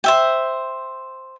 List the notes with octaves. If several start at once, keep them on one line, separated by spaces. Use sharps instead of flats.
C5 E5 G5